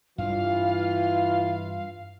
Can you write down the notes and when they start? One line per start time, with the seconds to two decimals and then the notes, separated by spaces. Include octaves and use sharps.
0.18 G2 E3 G3 F4 F5